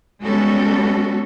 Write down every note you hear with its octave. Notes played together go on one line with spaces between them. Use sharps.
G3 G#3 B3 C#4 F#4 A4